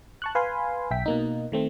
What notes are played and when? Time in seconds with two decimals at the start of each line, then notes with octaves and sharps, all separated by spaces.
0.22 A5 C#6 F#6
0.35 B4 F5 G#5 B5 C6
0.91 B1 E5 G5 B6
1.06 B2 A#3 D#4
1.52 D#3 A3 C4